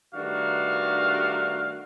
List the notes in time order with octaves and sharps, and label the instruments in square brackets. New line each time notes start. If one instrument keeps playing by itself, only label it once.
[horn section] G2 D#3 A3 D4 F#4 F5